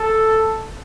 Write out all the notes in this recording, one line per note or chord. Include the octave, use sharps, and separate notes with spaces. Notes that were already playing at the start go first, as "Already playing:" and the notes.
Already playing: A4